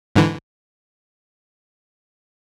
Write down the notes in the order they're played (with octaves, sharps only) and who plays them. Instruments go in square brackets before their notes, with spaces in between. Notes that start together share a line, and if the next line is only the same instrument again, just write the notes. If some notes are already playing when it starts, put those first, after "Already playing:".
[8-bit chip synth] G#2 D3 E3